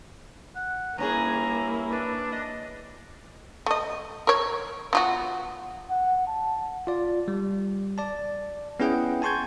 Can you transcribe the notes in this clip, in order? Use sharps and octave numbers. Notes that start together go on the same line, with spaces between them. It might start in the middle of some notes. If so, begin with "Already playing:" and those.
F#5
G2 A#3 C#4 E4 G#4 A#5
D4 B4
D#5
A3 D#5
A#4 C#5
B3 F4 F#4
F#5
A5
F4 D5
G3
D5 A5
B3 C#4 E4 G#4 F#5 G5
G#5 A5 C6 C#6 G6 G#6